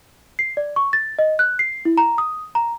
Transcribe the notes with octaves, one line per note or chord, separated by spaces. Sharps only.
C7
D5
C#6
A6
D#5
F#6
C7
E4
A#5
D#6
A#5